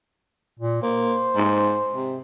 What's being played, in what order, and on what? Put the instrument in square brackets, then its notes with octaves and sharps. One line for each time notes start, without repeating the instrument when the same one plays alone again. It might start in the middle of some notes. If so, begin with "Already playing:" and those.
[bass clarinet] A#2
[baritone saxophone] A#3 [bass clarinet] C5
[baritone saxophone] G#2
C3